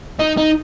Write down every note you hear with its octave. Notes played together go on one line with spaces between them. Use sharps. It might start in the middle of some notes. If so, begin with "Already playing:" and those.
D#4
D#4